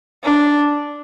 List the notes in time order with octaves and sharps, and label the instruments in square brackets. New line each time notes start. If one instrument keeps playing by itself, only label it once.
[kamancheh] D4